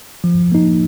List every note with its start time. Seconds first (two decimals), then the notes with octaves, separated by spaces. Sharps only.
0.24 F3
0.52 A#3 D#4